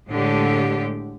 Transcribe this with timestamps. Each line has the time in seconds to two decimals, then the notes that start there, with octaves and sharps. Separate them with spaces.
0.10 A2 D3 G#3 G4